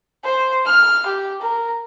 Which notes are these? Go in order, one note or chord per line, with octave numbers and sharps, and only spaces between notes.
C5
F6
G4
A#4